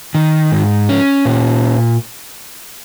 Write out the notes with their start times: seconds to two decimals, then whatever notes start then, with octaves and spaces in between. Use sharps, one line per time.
0.15 D#3
0.52 G#2
0.89 C#4
1.25 A#2